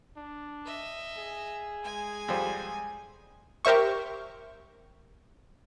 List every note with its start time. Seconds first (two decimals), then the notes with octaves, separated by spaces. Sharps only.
0.17 D4
0.66 D#5 E5
1.17 G#4
1.83 G#3 G#5
2.28 F2 G3 C5
3.65 G4 A#4 C5 E5 C#6